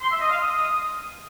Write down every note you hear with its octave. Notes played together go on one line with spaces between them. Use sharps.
C6
E5
D#5
F5
D#6